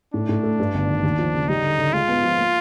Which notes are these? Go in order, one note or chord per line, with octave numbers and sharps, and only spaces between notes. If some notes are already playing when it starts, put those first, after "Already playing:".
A2 D4
A2
A3
G2
G1
D#3
D#2
F3
C#3
G3 D#4
D3
D3
G#3 F4
B3
F3
A#3